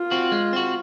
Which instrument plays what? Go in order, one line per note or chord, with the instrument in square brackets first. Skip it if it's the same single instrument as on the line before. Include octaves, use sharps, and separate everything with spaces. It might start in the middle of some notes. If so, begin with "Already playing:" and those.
Already playing: [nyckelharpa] F4
[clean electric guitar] C4 F#4
G#3
C4 F#4